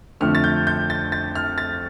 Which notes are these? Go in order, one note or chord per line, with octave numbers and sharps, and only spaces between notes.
F2 D3 F3 A3 F6
A6
G6
G6
A6
A6
F6
A6